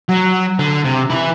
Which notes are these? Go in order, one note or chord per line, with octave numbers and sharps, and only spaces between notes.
F#3
D3
C3
E3 E4